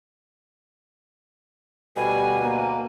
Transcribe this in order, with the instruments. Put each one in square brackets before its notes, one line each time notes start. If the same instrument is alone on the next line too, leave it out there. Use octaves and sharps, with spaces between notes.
[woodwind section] D2 B2 [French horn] G3 [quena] G#5
[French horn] A#3